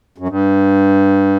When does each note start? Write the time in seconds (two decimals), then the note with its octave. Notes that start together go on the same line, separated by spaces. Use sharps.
0.18 F#2
0.28 G2